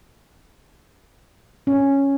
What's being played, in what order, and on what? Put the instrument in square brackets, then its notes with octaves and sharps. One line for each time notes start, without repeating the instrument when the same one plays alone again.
[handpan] C#4